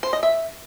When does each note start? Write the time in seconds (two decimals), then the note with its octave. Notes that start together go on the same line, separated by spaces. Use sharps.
0.03 C5
0.13 D#5
0.23 E5